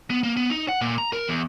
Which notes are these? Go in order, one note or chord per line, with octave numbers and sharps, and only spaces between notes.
B3
A#3
B3
D#4
F#5
A#2
A#5
A#4
E2